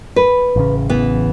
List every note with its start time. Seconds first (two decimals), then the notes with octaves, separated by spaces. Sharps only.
0.16 B4
0.56 A1 C#3
0.89 E3 B3